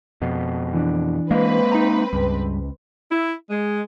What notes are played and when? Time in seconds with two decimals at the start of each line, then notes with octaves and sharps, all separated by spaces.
0.22 F2 B2
0.73 E3 D4
1.31 G#3 A#3 C4 B4
1.72 D#4 A#5
2.13 C#2 G2
3.09 E4
3.48 G#3